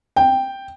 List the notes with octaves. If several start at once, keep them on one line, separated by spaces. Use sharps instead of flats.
G5